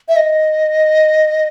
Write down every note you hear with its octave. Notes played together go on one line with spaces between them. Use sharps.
E5
D#5